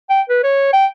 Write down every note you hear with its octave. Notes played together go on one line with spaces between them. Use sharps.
G5
B4
C#5
G5